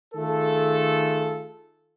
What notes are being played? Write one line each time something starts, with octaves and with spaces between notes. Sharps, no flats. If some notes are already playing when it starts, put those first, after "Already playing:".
D#3 A3 F4 G#4 A4